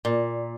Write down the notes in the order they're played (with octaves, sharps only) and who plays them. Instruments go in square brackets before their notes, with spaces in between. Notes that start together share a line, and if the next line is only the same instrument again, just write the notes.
[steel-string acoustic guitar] A#2